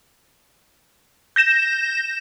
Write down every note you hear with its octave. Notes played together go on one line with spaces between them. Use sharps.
G6 A#6 E7